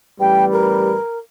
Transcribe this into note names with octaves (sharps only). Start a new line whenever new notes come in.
A1 G3 B4 G5
A#4